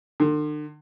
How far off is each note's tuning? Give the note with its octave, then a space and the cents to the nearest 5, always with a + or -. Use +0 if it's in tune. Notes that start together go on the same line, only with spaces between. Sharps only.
D3 +40